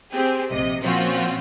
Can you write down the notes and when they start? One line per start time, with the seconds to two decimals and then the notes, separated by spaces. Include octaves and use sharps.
0.11 C4 G4 G#4
0.51 A#1 C3 D#5
0.82 A#2 F3 C4 C#4 F4 F#4